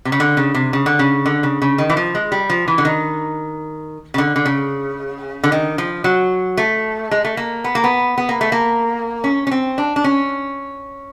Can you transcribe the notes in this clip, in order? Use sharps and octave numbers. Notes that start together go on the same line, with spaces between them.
C3
C#3
D3
C#3
C3
C#3
D3
C#3
D3
C#3
C#3
D#3
E3
F3
G#3
G3
F3
E3
D3
D#3
C#3
D3
D3
C#3
D3
D#3
F3
F#3
A3
G#3
A3
A#3
B3
A#3
B3
B3
A#3
A3
A#3
C#4
C#4
C4
D4
D4
C#4